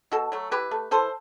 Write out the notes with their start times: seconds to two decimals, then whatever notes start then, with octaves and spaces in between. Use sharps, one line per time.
0.12 B2 F#4 A4
0.32 F#3 A3
0.51 E3 G4 B4
0.71 A3
0.91 E3 A4 C5